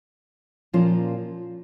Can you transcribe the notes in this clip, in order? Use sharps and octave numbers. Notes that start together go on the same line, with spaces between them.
A#2 F3 A#3 C#4 F4